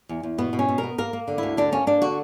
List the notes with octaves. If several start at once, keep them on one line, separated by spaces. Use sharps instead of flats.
E2
E2
B2 B3
B2
C#4
B2
A#4
B3
A#3 A#4
A#3
D3
D2 E4
D3 D4
A#3 C#4
A#3 D4
D3 F#4